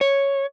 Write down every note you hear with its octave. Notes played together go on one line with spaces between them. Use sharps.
C#5